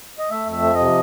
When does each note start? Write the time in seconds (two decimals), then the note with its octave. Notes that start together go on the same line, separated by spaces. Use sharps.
0.18 D#5
0.30 A3 E5
0.46 F2
0.52 E5
0.63 F3
0.74 D#5
0.80 C3